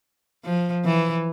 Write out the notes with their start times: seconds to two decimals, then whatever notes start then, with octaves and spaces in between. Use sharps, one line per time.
0.44 F3
0.85 E3